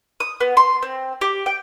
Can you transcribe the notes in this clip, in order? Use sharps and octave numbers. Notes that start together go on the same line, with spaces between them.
D#6
B3
C6
C4
G4
G5